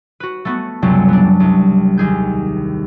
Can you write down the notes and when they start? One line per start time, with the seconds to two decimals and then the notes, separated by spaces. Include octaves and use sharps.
0.20 F#4 B4
0.45 A3 B3 F#4
0.82 C#2 F#2 C3 F#3 G3
1.09 B3 D4
1.40 C2
1.97 D#2 G#4 G6